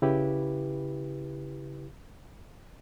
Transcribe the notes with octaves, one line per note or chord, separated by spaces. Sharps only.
C#3 E4 G4 B4